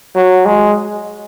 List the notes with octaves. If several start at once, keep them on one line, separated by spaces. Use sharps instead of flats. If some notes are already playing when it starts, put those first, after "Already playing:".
F#3
G#3